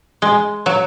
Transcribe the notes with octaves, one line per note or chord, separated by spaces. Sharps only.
G#3
F#3